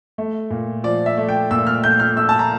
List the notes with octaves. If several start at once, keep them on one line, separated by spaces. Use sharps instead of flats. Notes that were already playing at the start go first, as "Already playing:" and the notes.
A3
A#2
F3 D5
E5
A3
G5
A#2 E6
F6
A3 G6
F6
A3 E6
A5
A#5